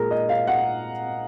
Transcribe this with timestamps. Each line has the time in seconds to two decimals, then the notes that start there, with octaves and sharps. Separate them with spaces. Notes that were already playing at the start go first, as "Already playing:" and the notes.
Already playing: A#2 G#3 G#4 A#4
0.11 D#5
0.29 F5
0.47 F#5